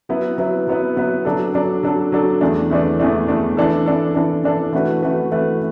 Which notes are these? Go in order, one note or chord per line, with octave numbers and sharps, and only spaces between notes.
F#3 B3 E4 B4
F#3 B3 E4 B4
F#3 B3 E4 B4
F#3 B3 E4 B4
F#3 D4 A4
F#3 D4 A4
F#3 D4 A4
F#3 D4 A4
E2 E3 A3 D4
E2 E3 A3 D4
E2 E3 A3 D4
E2 E3 A3 D4
E3 D4 A4
E3 D4 A4
E3 D4 A4
E3 D4 A4
E3 A3 F#4 B4
E3 A3 F#4 B4
E3 A3 F#4 B4